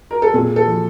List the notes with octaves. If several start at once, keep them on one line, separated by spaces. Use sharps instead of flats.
A#4
A4
A#2 G#4
A4
F3